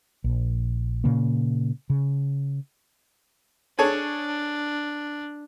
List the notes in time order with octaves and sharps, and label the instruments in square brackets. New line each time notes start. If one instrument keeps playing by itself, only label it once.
[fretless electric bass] A#1
A#2 C#3 A#3
C#3
[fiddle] D4 [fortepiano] G#4 A4 C#5